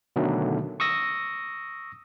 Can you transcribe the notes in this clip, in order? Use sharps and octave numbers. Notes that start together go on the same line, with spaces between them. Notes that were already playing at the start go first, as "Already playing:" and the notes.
B2 D3 D#3 F#3 A3
C#6 D#6 E6 A#6